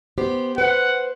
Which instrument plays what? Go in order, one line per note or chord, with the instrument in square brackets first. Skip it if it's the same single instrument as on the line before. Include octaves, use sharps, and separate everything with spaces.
[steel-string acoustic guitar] B3 G4 C5
[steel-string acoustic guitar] B4 C5 [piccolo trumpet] F#5